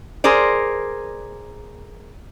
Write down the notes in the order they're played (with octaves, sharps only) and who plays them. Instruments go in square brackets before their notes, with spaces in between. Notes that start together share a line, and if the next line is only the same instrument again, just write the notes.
[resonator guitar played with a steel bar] G#4 A#4 C5 D5